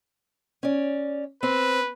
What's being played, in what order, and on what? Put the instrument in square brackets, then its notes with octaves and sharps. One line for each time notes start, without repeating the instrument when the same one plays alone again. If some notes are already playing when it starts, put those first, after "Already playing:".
[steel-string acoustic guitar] C#4 D5
[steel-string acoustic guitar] C4 [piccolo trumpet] B4